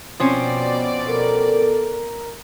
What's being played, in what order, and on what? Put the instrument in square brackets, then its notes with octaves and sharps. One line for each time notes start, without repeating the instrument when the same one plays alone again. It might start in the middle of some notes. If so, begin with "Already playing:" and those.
[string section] B2 D5 [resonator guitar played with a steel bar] F3 C4 C#4
[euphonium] A4 [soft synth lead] A#4